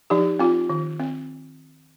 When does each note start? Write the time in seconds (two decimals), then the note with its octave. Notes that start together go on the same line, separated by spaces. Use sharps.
0.10 F3 D#4 G4
0.39 C4 F4
0.70 D#3
1.00 C4